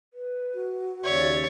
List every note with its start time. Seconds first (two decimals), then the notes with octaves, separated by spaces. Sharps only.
0.14 B4
0.55 F#4
1.04 D#2 C#3 C#5 D5 E5